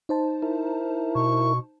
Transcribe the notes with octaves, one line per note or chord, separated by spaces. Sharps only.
D#4 C5 A5
E4 A#4
B2 C#6